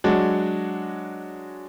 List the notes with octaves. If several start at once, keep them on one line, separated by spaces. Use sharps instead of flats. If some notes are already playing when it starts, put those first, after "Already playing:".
F#3 G#3 D4 F#4